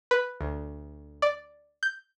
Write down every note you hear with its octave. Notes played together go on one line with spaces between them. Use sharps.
B4
D2
D5
G6